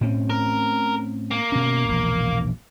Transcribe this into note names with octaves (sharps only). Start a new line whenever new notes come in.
A2 C4 C#4
A#4
A#3
B2 C#4
E1 A#1